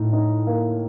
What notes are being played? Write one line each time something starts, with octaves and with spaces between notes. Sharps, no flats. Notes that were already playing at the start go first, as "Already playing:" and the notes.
Already playing: A2 D#4
D#4
A#3